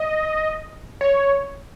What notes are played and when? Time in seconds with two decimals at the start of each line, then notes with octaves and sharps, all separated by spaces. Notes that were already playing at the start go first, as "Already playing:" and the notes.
Already playing: D#5
1.01 C#5